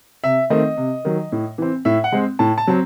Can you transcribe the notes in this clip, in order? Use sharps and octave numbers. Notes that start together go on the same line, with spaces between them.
C3 E5
D#3 A3 C4 D#5
C3
D#3 F#3
A2
E3 C4
A2 E5
F#5
G#3 C4
A2 A5
A5
F#3 C4